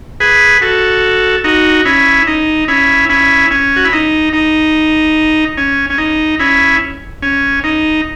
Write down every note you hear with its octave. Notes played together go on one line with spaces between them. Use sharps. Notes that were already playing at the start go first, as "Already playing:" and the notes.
G#4 B4
F#4 A4
D#4 F#4
C#4 E4
D#4
C#4 E4
C#4 E4
C#4
F#4
E4
D#4
D#4
C#4
C#4
D#4
C#4 E4
C#4
D#4